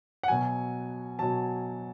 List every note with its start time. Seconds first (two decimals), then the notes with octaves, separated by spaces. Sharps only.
0.23 F#5
0.28 B2 F#3 G#5
1.19 B2 F#3 A5